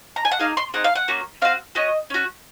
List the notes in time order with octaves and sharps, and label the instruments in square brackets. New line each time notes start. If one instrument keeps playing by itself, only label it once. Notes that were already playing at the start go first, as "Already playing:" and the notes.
[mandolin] A#5
G#5
F#5
A#3 D#4 G#4 F5
C6
C4 D#4 G#4 F#5
F5
F#5
A#3 C#4 F#4
C4 F#4 F5
C#4 F#4 D#5
C#4 F#4